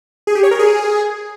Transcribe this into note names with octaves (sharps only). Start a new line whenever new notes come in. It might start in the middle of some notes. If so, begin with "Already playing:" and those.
G#4
G4
C#5
A#4
G#4